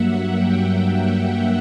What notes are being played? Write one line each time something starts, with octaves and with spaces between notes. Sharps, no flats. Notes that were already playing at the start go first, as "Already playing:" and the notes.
Already playing: G2 F#3 A#3 E5 F#5
G5